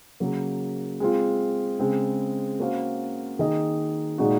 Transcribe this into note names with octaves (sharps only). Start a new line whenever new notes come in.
C#3 F#3 A#3
G#3 C4 F4
C#3 G#3 C4
A#3 C#4 F#4 C5 F5
D#3 A#3 D#4 G#4 D#5
A#2 G#3 D#4 F#4